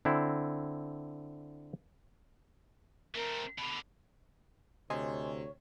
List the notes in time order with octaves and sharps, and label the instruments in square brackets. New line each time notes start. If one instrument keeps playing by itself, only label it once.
[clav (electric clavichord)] D3 C4 E4
[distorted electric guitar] A3 C4 [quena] A#4
[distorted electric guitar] B2 D3 [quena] B5
[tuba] D2 [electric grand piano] C3 [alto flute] C#5 [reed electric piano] D#5 G#5 C6